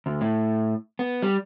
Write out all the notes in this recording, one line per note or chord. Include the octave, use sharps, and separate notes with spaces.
D2
A2
B3
G3